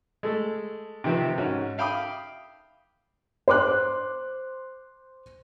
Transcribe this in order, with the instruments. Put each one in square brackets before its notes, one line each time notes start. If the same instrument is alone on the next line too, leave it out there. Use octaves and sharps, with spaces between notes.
[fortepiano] G#3 A3 A4
C3 D#3 F3 C4 G4 B4
G#2 C#4 F#4
E5 F5 G5 B5 D6 D#6
[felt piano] C5 C6 D6 F#6